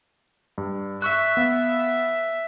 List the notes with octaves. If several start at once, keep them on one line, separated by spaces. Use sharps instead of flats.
G2
E5 C#6 E6 F#6
B3 F5